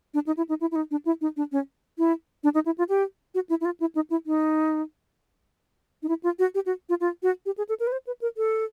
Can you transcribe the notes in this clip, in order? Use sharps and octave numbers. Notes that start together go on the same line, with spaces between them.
D4
D#4
E4
D#4
E4
E4
D#4
D4
E4
D#4
D4
C#4
E4
D4
D#4
E4
F4
G4
F#4
E4
E4
F4
E4
D#4
E4
D#4
D#4
E4
F4
F#4
G4
F#4
F4
F4
F#4
G4
G#4
A4
A#4
B4
C5
B4
A#4
A4